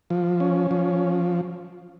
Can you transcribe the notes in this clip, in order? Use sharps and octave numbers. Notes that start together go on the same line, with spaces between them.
F3
C#4
F3